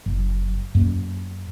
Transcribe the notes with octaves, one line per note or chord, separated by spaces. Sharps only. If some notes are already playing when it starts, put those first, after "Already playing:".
F#1
F#2 A#3